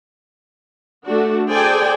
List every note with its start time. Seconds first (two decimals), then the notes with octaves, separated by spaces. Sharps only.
1.06 A3 D4 F#4
1.50 G#4 A4 C5 D5 G5 G#5